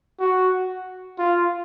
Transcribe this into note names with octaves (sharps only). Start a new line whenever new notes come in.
F#4
F4